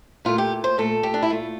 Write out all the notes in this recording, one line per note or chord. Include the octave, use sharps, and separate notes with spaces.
A#2 A3 F4
G4
C5
A#2 A3 A4
G4
D4
E4
A#2 A3 F4